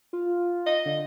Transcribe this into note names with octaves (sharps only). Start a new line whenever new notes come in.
F4
D#5
D3